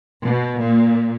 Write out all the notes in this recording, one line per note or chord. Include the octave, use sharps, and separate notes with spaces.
B2
A#2